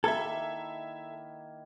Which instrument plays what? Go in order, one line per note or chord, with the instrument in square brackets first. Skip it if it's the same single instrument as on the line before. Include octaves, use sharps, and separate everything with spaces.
[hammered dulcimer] D#3 A#3 E4 [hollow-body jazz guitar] A4 [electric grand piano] E5 G#6